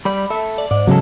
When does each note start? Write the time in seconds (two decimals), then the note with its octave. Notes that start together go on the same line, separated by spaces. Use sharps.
0.05 G3 D5 B5
0.30 A4 E5
0.58 D5
0.71 G#2 D5
0.87 E2 C#3 F#3 G#3 A4